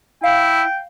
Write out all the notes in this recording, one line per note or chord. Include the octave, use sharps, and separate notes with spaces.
E4 F5 G5